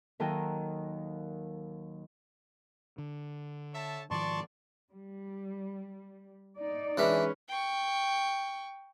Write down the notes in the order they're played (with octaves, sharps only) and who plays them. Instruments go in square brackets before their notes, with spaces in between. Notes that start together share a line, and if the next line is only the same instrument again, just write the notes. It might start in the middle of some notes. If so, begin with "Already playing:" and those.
[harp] D#2 D#3 F#3 A4 D#5 G5
[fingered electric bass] D3
[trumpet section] C#5 E5 A5
[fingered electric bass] G#2 D#3 F3 [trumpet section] D5 [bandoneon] A5 C6 C#6
[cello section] G3
D#4 D5
[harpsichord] E3 D4 E5 [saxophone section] G#3 C#4 B4
[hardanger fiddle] G5 C#6